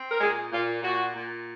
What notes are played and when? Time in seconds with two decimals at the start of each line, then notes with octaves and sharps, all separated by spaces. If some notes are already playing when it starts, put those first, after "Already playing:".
Already playing: C4
0.10 A#4
0.20 A#2 G#3 G#4
0.51 A#2 F4
0.83 A#2 F#4
1.15 A#2